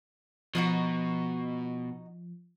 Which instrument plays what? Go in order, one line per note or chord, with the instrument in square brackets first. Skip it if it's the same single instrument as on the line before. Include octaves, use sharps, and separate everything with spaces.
[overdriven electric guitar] B2 [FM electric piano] F3 [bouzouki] D#4 F4 F#4